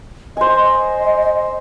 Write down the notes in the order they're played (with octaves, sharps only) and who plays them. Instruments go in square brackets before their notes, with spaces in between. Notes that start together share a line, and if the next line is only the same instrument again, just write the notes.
[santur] C5 G#5 [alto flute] D#5